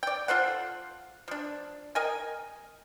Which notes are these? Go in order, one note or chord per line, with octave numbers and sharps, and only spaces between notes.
D5 G5
F4 A4 C5 F#5
F3 D4
A#4 D#5 G5 G#5